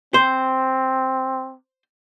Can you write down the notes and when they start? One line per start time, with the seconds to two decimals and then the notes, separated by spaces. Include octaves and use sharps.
0.14 C4 C5